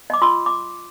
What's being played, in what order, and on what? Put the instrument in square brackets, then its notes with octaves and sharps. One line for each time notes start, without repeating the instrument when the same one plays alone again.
[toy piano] D#5 D6
F4 C6 E6
D6